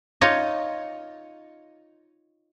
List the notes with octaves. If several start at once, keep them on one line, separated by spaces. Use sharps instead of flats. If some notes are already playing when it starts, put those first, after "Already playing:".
D#4 F4 C#5 D#5